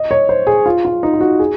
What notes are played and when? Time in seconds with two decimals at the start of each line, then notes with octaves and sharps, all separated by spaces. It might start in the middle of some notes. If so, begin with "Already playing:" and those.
Already playing: D#5
0.11 C#5
0.29 C5
0.47 G#4
0.66 F4
0.85 F4
1.03 D#4
1.14 F4
1.21 F#4
1.39 G#4